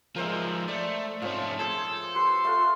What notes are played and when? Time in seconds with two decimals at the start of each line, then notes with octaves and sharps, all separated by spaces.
0.16 F3 G#3 A#4 C5 E5
0.68 A3 D5
1.22 G#2 F3 A3 C4 C#4
1.59 G#4 A4 C5 C6
2.15 G4 B4 C6
2.44 A3 F4 F#5